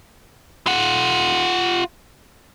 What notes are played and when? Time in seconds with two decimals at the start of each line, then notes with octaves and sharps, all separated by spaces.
0.67 F4 F#5